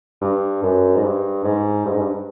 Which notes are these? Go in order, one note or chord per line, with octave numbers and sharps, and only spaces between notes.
G2
F#2
G#2
G2
G#2
G2
G#2
G2